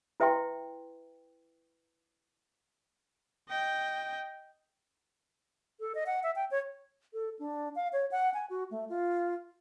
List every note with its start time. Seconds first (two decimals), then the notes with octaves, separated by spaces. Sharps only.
0.20 E4 B4 E5 G5 C6
3.49 D#5 G5
5.80 A4
5.95 D#5
6.06 F#5
6.23 E5
6.36 G5
6.51 C#5
7.14 A4
7.39 D4
7.75 F5
7.93 C#5
8.11 F#5
8.34 G#5
8.50 F#4
8.71 A3
8.89 F4